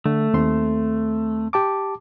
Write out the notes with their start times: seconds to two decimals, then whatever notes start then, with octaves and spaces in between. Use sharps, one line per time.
0.06 D3 A3
0.34 D#2 C4 C6
1.53 G4 A5 D6